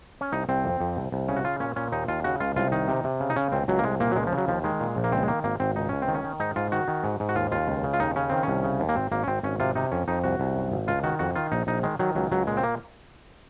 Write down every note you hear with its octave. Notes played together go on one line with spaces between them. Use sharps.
C#4
C2 D#4
C2 C4
F2
F2
C2
C2
C#3 C#4
F#4
C#3 F4
A#2 C#4
A#2 C#4
D#2 D#4
D#2 F4
C#3 F#4
C#2 F4
C2 F4
D#3 D#4
C3
C3
C#3
D#4
C#3 C#4
C#2 C4
C#2 F#3
A#3
C2 G#3
A#2 A#3
F#3
C#2 G#3
F3
C#3
F#3
D#2 F3
D#3 G#3
A#2
A#1
A#3
C#2 C4
G#3
D#3 A#3
G#1 A#3
G#1 C4
C#2 D#4
C#2 C#4
C4
D#3
C#4
D#3
G#2 D#4
G#2 F4
D#3 F#4
D#3
G#2
G#2
F#4
D#2 F4
D#2 F4
C#2
C#3
F4
D#2 D#4
C#3 C#4
D#3 C4
C2 C#4
C#3
D#2
A#3
G#1 C4
G#1 A#3
C#4
G#1 C4
G#1 C#4
C3 F4
C3 D#4
F2 C#4
F2 D#4
C2 F#4
C2
F#2
G#1
C#2 F4
D#3 F#4
F2 F#4
D#3 F4
A#1 D#4
A#1 D#4
D#3 G#3
D#3 F#3
C#2 F#3
C#2 F#3
A#2 G#3
C4
A#3